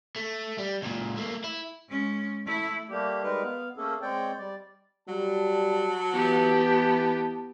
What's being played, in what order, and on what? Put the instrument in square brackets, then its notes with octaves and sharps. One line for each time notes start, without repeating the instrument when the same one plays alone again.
[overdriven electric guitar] A3
G3
C#2 A#2
A3 A#3
E4
[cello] G#3 C#4
A3 E4
[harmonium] G3 A3 A#3 G4
G3 G#3 D#4 A#4 B4
B3 F5
A3 A#3 C#4 G#4 A4
G#3 C4 C#5 D5 G5
G3 D5
[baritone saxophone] F#3 [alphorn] G3 [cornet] A5
[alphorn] E3 [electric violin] B3 G4